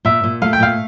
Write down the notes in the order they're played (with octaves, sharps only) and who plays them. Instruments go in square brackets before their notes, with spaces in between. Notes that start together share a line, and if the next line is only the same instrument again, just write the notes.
[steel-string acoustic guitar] A#2 [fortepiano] E5
[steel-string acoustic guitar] A#2
[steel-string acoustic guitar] A3 [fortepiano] F5
[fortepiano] G5
[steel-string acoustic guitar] A#2 [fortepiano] F5